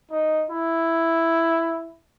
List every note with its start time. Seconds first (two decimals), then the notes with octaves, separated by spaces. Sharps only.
0.11 D#4
0.50 E4